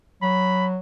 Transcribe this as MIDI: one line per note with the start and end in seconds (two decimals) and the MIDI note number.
0.22 0.79 54
0.22 0.67 83